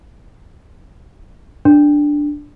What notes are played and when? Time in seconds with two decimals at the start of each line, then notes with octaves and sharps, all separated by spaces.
1.65 D4